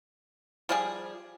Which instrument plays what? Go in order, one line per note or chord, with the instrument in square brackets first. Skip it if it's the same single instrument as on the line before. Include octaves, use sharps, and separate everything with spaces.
[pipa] F3 G3 G#4